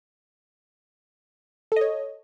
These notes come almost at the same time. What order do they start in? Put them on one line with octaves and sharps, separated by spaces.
A4 D#5 C#5